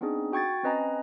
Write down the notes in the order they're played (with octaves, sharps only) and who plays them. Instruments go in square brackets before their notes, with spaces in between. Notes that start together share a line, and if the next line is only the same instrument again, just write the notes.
[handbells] B3 C4 D4 D#4 G#4
F#4 G5 C#6 G#6 A6
C4 C#4 B4 D#5 G#5 A#5